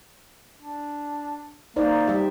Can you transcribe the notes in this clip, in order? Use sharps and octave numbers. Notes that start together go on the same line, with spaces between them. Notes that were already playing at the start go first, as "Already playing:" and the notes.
D4
A#3 D#4 C5 D5
G3 G4 E5